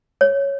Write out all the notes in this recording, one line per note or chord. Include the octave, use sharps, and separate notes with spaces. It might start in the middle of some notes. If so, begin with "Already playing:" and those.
C#5